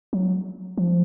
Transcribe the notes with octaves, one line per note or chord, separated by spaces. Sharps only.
F#3
F3